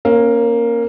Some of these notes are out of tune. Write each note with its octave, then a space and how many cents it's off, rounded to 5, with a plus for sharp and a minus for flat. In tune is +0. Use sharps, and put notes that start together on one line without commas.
A#3 +0 C#4 -25